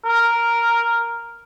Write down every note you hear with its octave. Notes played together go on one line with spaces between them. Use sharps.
A#4